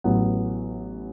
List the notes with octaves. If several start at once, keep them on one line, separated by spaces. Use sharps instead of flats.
A1 A2 F#3 B3